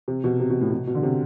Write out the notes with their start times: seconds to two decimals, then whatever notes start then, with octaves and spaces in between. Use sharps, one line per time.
0.08 C3
0.24 B2
0.40 C3
0.50 B2
0.61 A2
0.71 B2
0.87 B2
0.95 D3
1.03 C3